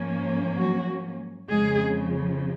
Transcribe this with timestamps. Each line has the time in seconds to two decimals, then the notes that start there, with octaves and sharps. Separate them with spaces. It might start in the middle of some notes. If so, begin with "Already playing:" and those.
Already playing: G#2 F3 A#3 C#4
0.56 F#3 F#4
1.49 F2 C#3 F3 G#3 G#4